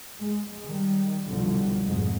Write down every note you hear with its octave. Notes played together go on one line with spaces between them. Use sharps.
G#3
D#3 G3
C2 F#2 B2 D3 F3 G3
F1 B1 G#2 G#3